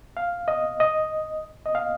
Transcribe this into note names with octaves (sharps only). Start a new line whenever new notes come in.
F5
D#5
D#5
D#5
F5